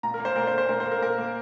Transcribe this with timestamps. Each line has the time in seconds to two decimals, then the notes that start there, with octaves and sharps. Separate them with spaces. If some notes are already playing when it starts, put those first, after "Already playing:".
0.03 A#2 A#5
0.14 A#4
0.20 A#3
0.25 C5
0.36 A#2 A#4
0.47 C5
0.53 A#3
0.58 C5
0.69 A#2 A#4
0.80 C5
0.86 A#3
0.92 A#4
1.02 A#2 A#4
1.18 A#3